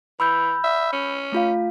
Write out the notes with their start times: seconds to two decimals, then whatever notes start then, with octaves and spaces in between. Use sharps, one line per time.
0.20 E3 B5 E6 G6
0.64 E5
0.93 C#4
1.32 A3 F4 F5